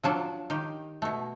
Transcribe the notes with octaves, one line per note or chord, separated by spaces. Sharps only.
F3 F#3 D4 A4
D#3 G4
B2 A3